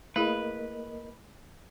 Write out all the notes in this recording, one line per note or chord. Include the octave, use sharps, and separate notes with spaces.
A3 A#3 E4 G#4 A#4 B4 D#5